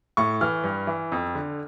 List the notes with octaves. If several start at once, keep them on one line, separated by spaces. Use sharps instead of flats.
A2 C#6
E3 F6
G2
E3
F2
D3